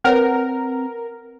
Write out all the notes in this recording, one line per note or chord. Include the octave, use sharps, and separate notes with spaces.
C4 A#4 B4 C#5 F#5